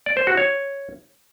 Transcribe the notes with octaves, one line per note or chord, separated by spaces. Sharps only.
D5
C5
F#4
C#5